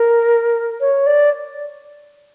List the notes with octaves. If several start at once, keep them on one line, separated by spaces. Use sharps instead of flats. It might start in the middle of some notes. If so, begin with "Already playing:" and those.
Already playing: A#4
C#5
D5